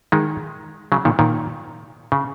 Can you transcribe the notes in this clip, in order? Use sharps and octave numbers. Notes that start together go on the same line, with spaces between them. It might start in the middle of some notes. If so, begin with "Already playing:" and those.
D#3 G#3
C#3 F#3
A#2 D#3
A#2 D#3
C#3